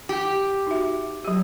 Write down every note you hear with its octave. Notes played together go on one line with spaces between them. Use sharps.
G4
D#4 F#4 E5
F#3 G4